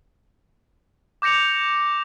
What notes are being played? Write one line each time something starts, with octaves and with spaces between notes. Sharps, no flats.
D6 G6 A#6 C#7 F7